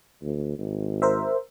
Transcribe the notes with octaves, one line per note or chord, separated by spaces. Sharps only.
D2
G#1
A#4 C5 E5